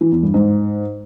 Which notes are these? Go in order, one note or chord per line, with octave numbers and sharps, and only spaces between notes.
E3
E2
G2
G#2